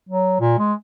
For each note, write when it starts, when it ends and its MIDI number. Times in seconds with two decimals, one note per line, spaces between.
0.09 0.39 54
0.40 0.55 46
0.59 0.73 56